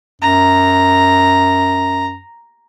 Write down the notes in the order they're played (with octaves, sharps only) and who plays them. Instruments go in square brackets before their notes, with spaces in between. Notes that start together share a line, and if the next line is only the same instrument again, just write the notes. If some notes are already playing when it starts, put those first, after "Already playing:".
[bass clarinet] F#2 [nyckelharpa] A#5